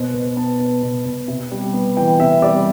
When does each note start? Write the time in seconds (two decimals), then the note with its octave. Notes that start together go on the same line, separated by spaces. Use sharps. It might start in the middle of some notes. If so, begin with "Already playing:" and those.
Already playing: B2 C5
0.14 B2 B4
0.37 B3 A5
0.60 B3
0.82 B2
1.06 B2
1.28 C3
1.51 G3
1.74 B3
1.97 E3 G5
2.19 C3 E5
2.42 G3 D5